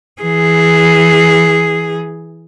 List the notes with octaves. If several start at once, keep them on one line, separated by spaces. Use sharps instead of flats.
E3 G#4